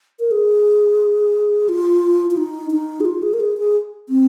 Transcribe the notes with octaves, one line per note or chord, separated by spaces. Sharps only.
A#4
G#4
F4
F4
D#4
D#4
G#4
F4
G#4
A#4
G#4
G#4
C4